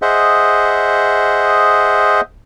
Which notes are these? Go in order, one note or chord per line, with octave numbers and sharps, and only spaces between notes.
G#4 C5 D#5 E5 F#5